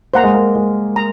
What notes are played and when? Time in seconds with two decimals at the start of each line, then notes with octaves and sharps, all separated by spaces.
0.14 A#3 C5 F#5 A#5
0.24 G#3
0.34 A#3
0.55 G#3
0.96 A#5